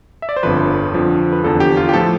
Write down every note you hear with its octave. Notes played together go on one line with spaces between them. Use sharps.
E5
D5
C5
G1 F2 D3 F3 B4
F2 D3 F3
B4
E2 D3 F3 A4
G4
F4
G4
A2 F3 A4